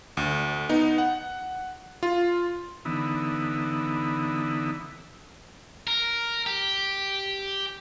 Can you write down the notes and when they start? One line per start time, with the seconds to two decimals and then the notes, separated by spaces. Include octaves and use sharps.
0.17 D2
0.69 B3 D#4
0.98 F#5
2.03 F4
2.85 D3 E3 B3 D#4 E4
5.87 A#4
6.46 G4